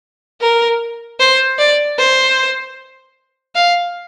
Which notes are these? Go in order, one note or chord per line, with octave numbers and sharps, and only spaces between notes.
A#4
C5
D5
C5
F5